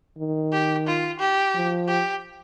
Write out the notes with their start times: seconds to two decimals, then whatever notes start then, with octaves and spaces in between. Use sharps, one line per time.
0.18 D#3
0.52 G4
0.87 F4
1.20 G4
1.55 F3
1.88 G4